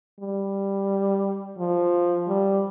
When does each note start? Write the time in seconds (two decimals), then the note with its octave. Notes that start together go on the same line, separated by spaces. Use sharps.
0.20 G3
1.58 F3
2.28 G3